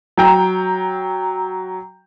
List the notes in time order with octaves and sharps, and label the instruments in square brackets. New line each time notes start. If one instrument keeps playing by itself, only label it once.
[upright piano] F#3 G5 A#5